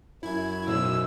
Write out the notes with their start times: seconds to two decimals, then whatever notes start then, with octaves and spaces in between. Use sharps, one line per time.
0.23 F#2 E4 G#6
0.68 B1 B2 C5 E6